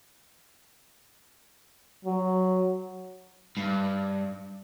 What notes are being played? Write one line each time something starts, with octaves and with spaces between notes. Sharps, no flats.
F#3
G2